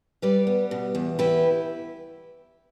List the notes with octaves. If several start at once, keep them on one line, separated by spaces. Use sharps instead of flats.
G3 B4 D5
B3
B2
E2
E4 G4 B4